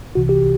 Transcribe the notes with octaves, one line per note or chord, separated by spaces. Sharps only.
C2 C3 E3 F#4
G4